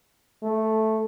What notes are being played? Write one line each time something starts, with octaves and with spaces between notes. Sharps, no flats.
A3